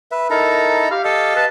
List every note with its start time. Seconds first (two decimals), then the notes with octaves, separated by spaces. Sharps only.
0.12 B4 E5
0.30 D#4 E4 A4 A#4 A#5
0.91 G4 F5
1.05 A4 D#5 F5
1.36 B4 A5